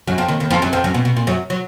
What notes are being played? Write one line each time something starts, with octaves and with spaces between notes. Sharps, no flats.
F#2 F#3
F2 F3
D#2 D#3
D#2 D#3
F2 F3
F#2 F#3
F2 F3
F#2 F#3
B2
B2
A#2
F#2 F#3
F#3